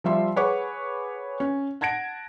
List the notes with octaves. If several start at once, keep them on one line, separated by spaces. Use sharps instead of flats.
F3 G3 E5 C6
G#4 B4 C#5 F#5 C#6 D6
C#4
F#5 A5 G#6 A#6 D7